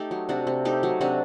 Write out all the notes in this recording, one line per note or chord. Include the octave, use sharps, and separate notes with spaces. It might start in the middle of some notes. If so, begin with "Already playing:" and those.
Already playing: A3 D#4 G4 A4
F#3
C3 D4 F#4
C3
A3 D#4 G4
F#3
C3 D4 F#4